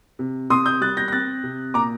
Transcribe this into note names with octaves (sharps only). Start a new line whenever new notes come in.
C3
C3 C6 D#6
D#6 G6
G3 F#6 A6
G6 A#6
A#6
C4 F#6 A6
C3
A#2 A#5 D6